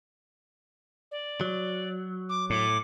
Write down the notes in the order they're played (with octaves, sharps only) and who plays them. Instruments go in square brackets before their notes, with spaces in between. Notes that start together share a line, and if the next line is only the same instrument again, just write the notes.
[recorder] D5
[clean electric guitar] F#3
[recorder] D6
[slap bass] A2 [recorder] D6